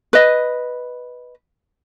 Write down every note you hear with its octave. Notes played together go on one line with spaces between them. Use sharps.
B4 D#5